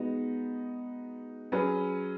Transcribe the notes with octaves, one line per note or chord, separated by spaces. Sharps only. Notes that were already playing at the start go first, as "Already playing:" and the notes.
Already playing: G#3 B3 D#4 F#4
F#3 C#4 G#4 B4